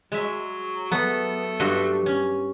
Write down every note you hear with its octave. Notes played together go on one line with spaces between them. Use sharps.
F#3 G#3 E5
F#3 A3 B3
G2 F#4 C6
C#4